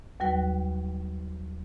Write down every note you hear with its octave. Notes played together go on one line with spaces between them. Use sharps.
D#2 F#3 G3 F#4 B4 G5